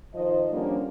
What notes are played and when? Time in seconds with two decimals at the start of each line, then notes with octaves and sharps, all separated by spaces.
0.14 D#3 F3 C5 D#5
0.50 D3 F3 G3 A#3 C#4 D4